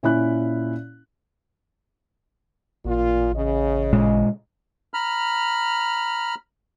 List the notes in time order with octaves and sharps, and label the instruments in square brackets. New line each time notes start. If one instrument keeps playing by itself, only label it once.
[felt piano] A#2 C#4 E4 B5 F#6
[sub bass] A1 [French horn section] A#2 F4
[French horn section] C#3 D#5
[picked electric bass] A#2 G#3
[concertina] A#5 B5 F6